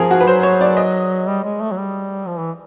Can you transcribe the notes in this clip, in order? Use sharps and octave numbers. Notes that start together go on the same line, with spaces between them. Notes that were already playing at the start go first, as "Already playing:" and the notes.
Already playing: F3 G#4 A#4
F#4
B4
F#3 C5
C#5
D5
D#5
G3
G#3
A3
F#3
G3
F3
E3